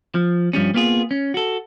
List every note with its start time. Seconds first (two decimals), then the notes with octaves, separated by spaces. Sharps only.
0.15 F3
0.53 G2 F3 G3 C#4
0.74 A#3 B3 F4 G#4
1.11 C#4
1.34 F#4 A4